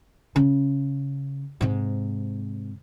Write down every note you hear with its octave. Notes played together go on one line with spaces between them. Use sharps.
C#3
G#2 C3